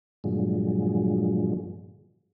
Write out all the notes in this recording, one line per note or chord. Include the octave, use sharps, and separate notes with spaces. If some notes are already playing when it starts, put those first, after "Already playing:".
G2 A#2 D3 F3 F#3 G#3